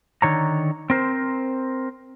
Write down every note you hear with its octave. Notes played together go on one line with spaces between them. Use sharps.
D3 D#3 C#5 A#5
C4 A#4 C5